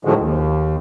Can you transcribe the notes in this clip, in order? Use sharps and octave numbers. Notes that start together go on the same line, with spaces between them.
A2 D3 D#3 F3 F#3 G#3
D#2